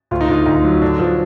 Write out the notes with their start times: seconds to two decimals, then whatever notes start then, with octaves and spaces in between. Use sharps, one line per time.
0.11 D2 F4
0.21 D#4
0.29 D3 F4
0.46 D2 D#4
0.64 F#3
0.82 D3 D4
0.99 F3